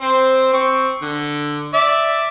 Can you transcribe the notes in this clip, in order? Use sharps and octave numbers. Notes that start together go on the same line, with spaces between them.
C4 C5
C4 C#6
D3
D5 E5